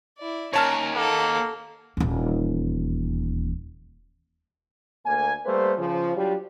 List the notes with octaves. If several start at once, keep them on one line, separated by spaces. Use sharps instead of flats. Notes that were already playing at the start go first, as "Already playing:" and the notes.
E4 D5
D#2 C#4 A#4 C#5 A5 F6
A#3 A4 F#5
D#1 E2
D2 A#3 G#5
G3 A3 A#3 B4 C5
C#3 F3
F#3 G3 D4 F4 G4